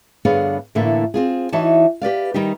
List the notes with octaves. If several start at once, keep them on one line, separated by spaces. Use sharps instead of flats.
G2 D3 B3 G#4 C#5 F5
A2 D3 E3 A3 A#3
C4 F4 G#4
E3 D#4 F#4 C#5 A5
G4 B4 D5 F5
D#3 G3 D#4 G4